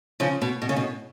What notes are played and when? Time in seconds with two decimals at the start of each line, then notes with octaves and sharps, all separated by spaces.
0.20 C#3 F3
0.41 B2
0.62 B2
0.69 C#3
0.76 B2